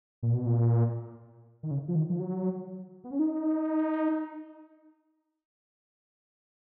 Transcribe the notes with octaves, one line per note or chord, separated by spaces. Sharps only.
A#2
B2
A#2
D#3
C#3
F3
D#3
F3
F#3
B3
C#4
D#4